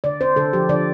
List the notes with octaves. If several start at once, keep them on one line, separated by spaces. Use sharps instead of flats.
D3 D5
C4 C5
D3 A4
F3 G4
D3 D5